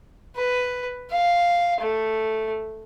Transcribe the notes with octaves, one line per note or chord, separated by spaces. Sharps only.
B4
F5
A3